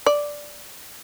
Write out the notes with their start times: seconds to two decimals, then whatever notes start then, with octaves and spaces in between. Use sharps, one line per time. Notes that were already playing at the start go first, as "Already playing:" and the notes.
0.06 D5